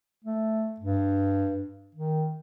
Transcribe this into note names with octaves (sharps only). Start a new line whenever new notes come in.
A3
G2
D#3